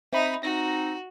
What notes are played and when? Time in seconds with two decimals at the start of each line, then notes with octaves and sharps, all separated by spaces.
0.13 C4 D#4 E5 B5
0.43 C4 D#4 F#4 A#6